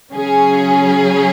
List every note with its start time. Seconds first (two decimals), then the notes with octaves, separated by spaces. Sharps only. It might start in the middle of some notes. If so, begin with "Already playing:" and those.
0.12 C#3 F#3 C#4 G#4